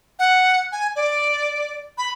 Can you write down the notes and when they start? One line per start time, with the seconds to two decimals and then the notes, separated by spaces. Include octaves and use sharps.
0.19 F#5
0.72 G#5
0.96 D5
1.98 B5